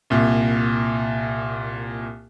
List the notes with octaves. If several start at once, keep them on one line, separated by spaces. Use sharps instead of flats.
C2 A#2